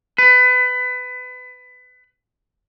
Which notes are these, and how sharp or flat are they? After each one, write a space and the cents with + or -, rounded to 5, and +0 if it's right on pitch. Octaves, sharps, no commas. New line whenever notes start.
B4 +25